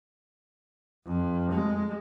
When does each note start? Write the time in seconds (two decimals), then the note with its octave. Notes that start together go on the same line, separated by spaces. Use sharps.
1.06 F2
1.52 G#3